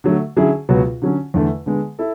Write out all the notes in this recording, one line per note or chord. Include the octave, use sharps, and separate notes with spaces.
D3 F#3 A3
D3 F#3 C#4 E4 G#4
C#2 B2 F#3 B3 F#4
D3 F#3 C#4
E2 D3 A3
D3 G#3 B3
E4 A4